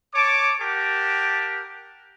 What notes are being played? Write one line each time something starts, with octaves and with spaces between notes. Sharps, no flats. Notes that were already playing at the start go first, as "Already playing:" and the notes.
C#5 A5 D6
G4 A#4 F#5 A5